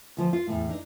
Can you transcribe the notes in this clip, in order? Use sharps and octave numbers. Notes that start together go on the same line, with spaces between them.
D2 F3
F4
E2 A2
D4 D#4